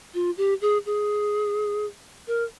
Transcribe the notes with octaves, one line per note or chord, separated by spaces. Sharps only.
F4
G4
G#4
G#4
A#4